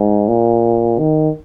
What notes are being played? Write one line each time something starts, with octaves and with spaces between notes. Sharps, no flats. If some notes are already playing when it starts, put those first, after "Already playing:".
Already playing: G#2
A#2
D#3